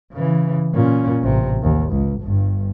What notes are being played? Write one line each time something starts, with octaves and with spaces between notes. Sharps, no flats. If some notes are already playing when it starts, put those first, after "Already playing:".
C#3 E3
A#2 C#4
A1 C3
D#2
C#2
G1 G2